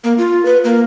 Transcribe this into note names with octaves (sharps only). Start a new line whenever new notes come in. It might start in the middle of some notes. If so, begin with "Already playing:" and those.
A#3
F4
B4
A#3